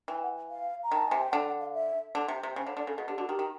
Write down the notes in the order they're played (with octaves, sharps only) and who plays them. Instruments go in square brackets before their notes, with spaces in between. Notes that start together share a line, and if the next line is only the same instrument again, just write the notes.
[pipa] E3 [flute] G5
[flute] F#5
F5
A#5
[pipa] D#3 [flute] A5
[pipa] C3 [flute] G#5
[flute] G5
[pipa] D3 [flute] F#5
[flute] F#5
F5
E5
[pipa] D3
C3
C3
[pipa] C#3 [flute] C5
[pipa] D3 [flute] C#5
[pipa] D3 [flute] D5
[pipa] C#3 [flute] A4
[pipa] B2 [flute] G#4
[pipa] D3 [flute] G4
[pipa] D3 [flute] F#4
[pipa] D#3 [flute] G4
[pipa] D#3